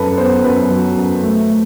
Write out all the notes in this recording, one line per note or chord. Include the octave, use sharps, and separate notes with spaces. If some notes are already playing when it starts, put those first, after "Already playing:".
Already playing: F#2 F#4 A4 B4
B3 C5
F#2 B4
F#3
F#2
A3
A3